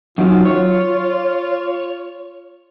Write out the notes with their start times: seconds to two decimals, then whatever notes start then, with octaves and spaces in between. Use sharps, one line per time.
0.18 F#2 D#3 F#3 F4
0.45 C#5